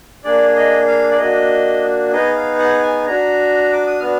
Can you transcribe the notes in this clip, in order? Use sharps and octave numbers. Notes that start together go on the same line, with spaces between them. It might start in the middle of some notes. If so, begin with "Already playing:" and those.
A#3 D4 G#4 D5
D#5
F5
D5
A#3 D4 F#4 D#5
B3 D#4 G#4 D#5
F5
F#5
G#5
D4 F#4 A#5
D6
D#6
B3 D4 F#4 F6